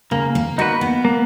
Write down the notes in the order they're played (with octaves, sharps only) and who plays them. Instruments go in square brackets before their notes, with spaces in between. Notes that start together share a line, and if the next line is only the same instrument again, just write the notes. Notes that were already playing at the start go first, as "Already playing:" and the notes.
[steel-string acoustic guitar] C#3 [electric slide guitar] A#3
[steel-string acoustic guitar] A#3
[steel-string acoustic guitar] A#3 [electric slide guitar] D#4 F#4 B4
[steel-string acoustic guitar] B3
[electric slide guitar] A#3